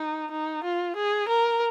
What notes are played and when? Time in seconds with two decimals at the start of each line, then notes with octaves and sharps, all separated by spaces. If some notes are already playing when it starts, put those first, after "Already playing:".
Already playing: D#4
0.31 D#4
0.64 F4
0.96 G#4
1.28 A#4